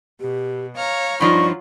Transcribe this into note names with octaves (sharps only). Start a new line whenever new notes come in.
B2 G4
C#5 F5 A#5 F6
G2 F3 F#3 D#4 F4 D5 C#6